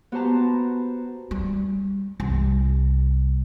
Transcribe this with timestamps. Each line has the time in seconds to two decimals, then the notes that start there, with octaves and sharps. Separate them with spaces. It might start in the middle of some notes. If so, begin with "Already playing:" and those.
0.12 B3 F#4 G4 C5 A5 A#5
1.31 G3
2.20 C2